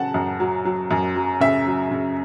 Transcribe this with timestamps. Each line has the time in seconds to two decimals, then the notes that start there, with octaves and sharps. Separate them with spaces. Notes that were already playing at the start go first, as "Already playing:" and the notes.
Already playing: C#3 F#3 F#5 A5
0.14 F#2
0.40 F#3
0.65 F#3
0.91 F#2
1.16 F#3
1.40 C#3 E5
1.67 F#3
1.91 C#3